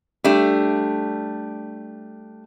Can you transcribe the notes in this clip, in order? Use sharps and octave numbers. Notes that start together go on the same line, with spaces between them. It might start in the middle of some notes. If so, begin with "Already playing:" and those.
G3 A3 D4